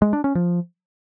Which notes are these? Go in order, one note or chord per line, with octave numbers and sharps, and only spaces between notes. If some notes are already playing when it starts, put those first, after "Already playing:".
G#3
D4
C#4
F3